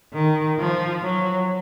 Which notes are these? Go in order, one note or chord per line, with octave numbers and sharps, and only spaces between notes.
D#3
F3
F#3